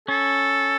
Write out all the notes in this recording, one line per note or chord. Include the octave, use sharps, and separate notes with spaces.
C#4 A4